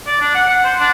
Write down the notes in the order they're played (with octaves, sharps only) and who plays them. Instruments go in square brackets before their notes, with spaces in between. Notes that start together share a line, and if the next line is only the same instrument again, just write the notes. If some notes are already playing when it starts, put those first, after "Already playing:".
[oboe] D5
D4
F#5
F#5
C5
D4